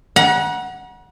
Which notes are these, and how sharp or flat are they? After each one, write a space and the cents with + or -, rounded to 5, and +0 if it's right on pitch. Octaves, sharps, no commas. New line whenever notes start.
F#5 +0 A#5 +45